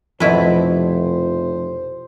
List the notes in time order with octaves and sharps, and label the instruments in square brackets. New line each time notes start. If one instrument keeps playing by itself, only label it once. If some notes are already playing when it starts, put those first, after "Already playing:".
[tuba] F1 [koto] B2 E4 B4 [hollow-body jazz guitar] F3 [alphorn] C5